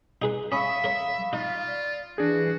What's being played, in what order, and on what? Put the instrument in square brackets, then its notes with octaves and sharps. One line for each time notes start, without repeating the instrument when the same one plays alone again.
[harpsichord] D#4 G#4 B4
[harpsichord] C#4 [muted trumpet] E5 [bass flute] F5 [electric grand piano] B5 C#6 D#6
[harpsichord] A#4 C#5
[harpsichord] D#4 [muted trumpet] F4
[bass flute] D5
[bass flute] E3 [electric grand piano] D4 G#4 [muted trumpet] F#4